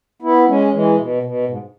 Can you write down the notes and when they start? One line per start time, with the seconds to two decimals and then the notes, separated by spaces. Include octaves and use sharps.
0.22 B3 E4
0.47 G#3 C#4
0.73 E3 G#3
0.97 B2
1.23 B2
1.48 G#2